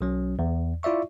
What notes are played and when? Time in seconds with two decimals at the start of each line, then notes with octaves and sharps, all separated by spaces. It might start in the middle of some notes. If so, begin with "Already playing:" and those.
0.01 B1 F#3 C#4
0.39 E2
0.83 E4 F4 D5 E5 C#6